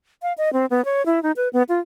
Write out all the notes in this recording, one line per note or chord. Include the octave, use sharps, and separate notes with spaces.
F5
D#5
C4
B3
C#5
E4
D#4
B4
B3
F4